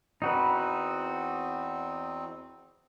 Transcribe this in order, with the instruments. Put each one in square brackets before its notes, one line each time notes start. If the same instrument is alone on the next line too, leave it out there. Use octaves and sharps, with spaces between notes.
[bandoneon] E2 C4 [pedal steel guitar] D#4 F#4 B4